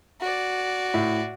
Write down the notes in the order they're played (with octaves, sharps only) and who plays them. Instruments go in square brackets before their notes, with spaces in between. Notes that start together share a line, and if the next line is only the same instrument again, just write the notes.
[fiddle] F#4 D5
[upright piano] A2